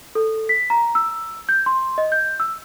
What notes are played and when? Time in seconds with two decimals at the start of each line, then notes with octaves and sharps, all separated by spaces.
0.15 A4
0.49 B6
0.70 A#5
0.95 E6
1.49 G6
1.66 C6
1.98 D#5
2.12 G6
2.40 E6